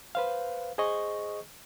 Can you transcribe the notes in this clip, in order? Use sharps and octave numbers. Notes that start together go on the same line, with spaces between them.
B4 C5 F5
G#4 C5 D#5 C#6